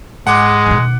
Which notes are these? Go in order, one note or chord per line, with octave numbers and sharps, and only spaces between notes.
G#2 G#3 F#5 D6
B2 D#3